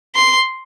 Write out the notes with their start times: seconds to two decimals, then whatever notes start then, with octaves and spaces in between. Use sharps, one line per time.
0.16 C6